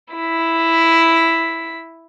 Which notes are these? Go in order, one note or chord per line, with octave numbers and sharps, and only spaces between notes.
E4 B6